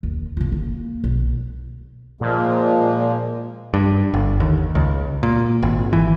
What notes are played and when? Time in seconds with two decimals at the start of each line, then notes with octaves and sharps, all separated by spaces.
0.03 D#2
0.37 C#3 F4
0.52 A#3
1.04 B1
2.21 A#2 F3 G#3 A#3
3.74 G2
4.14 G1
4.40 D#2
4.75 C#2
5.23 A#2
5.63 G#1
5.93 E3